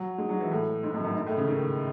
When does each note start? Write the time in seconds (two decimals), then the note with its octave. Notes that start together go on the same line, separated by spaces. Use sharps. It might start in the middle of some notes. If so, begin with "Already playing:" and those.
Already playing: F#3
0.18 G#3
0.29 F#3
0.41 E3
0.51 A2
0.83 G#2
0.94 F#2
1.05 F#2
1.15 G#2
1.26 A2
1.37 C#3
1.47 D#3